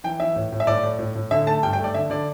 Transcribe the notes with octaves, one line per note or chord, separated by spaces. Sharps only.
E3 G5
E3 E5
A2
A2
E5
A2 D5
A2
A2
A2
D3 E5
A3 A5
G2 G5
G5
A3
D5
D3 E5
D3 D5